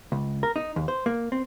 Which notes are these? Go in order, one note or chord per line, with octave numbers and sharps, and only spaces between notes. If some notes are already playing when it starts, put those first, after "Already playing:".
C#2
A#4
D#4
D#2
C5
A#3
C4